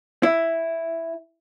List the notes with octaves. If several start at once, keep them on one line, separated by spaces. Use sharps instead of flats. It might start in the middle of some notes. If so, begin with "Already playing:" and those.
E4